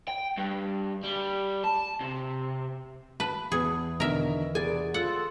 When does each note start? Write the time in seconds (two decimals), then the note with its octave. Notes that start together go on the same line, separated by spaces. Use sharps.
0.08 G5
0.38 G2
1.04 G3
1.64 A5
2.00 C3
3.20 B4 A5
3.52 E2 G#4
4.00 B2 D3 D#3 A#4 E5
4.55 C3 B3 G#4 D5 G#5
4.94 F4 A4 F#5